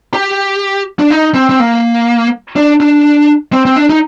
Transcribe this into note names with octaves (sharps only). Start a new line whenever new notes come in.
G4
D4
D#4
C4
C4
A#3
D4
D4
C4
C4
D4
D#4